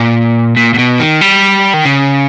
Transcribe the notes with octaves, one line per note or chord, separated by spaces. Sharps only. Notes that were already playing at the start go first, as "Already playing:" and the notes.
Already playing: A#2
A#2
A#2
B2
D#3
G3
D#3
C#3